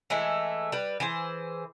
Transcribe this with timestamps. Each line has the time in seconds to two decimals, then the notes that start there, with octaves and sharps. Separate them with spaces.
0.10 E3 G#3 A3 E4
0.72 G3 B4
1.00 E3 G#4 C5